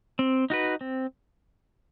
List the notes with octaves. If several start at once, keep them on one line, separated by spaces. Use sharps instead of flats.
C4
D#4 F#4 B4
C4